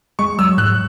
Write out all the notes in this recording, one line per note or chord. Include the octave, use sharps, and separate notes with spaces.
G#3 C#6
F#3 E6
G#2 F#6